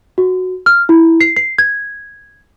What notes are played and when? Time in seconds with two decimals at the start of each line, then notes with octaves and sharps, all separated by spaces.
0.18 F#4
0.66 F6
0.89 E4
1.21 C7
1.37 C7
1.58 G#6